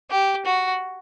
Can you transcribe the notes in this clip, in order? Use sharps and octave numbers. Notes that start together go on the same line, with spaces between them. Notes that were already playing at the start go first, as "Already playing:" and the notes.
G4
F#4